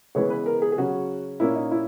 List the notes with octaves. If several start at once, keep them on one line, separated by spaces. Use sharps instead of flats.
C#3 E3 G#3 B3 C#5
B4
A#4
G#4
G#4
C#3 F#3 C#4 F#4
A#2 A#3 C#4 E4
D#4
E4